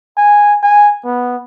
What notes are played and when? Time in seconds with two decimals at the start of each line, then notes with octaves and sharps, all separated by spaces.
0.17 G#5
0.63 G#5
1.05 B3